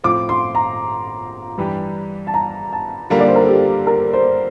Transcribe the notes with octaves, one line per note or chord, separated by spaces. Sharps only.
A2 F3 C4 F4 D6
C6
A#5
G2 E3 G3 D4 G4
A5
A#5
A5
D3 G3 A#3 D4 F4 A#4
D5
C5
A#4
A4
G4
A#4
C5